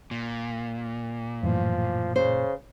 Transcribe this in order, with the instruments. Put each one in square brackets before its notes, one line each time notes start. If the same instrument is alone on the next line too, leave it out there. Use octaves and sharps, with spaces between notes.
[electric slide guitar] A#2
[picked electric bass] F#2 A2 E3 [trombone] F3
[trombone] C#3 [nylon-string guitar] C5